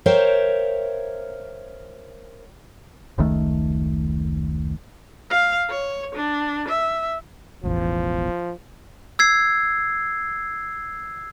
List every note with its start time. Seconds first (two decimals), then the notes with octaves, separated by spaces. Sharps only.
0.06 A#4 C5 C#5 E5 F5 G5
3.18 F1 C#2 D#3 A3
5.31 F5
5.70 C#5
6.15 D4
6.68 E5
7.63 E1 A1 E2 F3
9.19 E6 G#6 C7